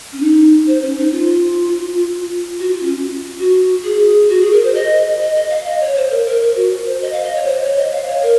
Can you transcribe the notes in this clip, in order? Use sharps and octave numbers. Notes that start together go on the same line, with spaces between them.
C#4
D#4
C5
C#4
D#4
F4
F#4
F4
C#4
F#4
G#4
F#4
G#4
A#4
C5
D#5
D#5
D#5
F5
D#5
C#5
C5
A#4
A#4
A#4
F#4
C5
D#5
F5
D#5
C#5
C5
C#5
D#5
F5
C#5
A#4